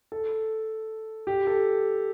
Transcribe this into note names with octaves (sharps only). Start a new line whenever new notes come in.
A4
G4
A4